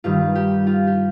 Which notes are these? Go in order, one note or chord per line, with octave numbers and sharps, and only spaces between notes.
G2 D#3 G3 F4
G4
F4
G4